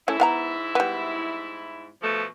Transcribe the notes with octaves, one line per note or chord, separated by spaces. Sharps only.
G#2 A3 C#4 E4
B3 F5 A#5
G3 B3
B2 F3 A3